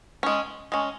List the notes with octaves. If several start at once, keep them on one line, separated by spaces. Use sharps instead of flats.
G#3 C#4
G#3 C#4